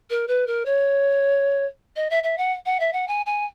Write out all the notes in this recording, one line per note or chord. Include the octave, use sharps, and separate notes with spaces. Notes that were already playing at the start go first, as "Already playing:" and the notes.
A#4
B4
A#4
C#5
D#5
E5
E5
F#5
F#5
E5
F#5
G#5
G#5